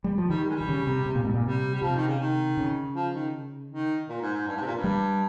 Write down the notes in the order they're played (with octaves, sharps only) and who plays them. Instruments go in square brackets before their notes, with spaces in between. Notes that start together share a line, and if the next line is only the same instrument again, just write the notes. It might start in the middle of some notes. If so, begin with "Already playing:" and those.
[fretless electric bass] G3
F3
[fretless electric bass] D#3 [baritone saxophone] G3
[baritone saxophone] G3
G#3
G3
[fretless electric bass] D#3
C#3
C3
C3
A#2
G#2
A#2
[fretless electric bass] C3 [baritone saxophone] G3
[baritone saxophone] G3
[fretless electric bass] C3 [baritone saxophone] F3
[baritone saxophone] D#3
C#3
D#3
[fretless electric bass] C#3
[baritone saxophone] F3
D#3
D#3
A#2
G#2
G#2
G2
G#2
C3
A#2
G2
[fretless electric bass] G3